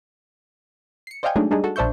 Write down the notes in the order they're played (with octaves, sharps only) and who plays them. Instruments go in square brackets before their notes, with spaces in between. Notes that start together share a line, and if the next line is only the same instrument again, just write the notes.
[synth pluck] C7 C#7
C5 D5 D#5 F5 G5 G#5
F#3 G#3 A3 D4 D#4 G#4
G3 D4 D#4 G#4
F#4 A4
A#1 D4 C5 E5 C#6 G6